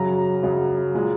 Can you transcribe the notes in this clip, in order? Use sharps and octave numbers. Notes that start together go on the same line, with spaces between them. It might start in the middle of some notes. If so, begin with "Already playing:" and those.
Already playing: F#2 C#3 F#3 A#5
F#2 C#3 F#3
A#2 G#3